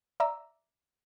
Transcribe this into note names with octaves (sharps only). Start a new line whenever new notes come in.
D5 E5 A#5 E6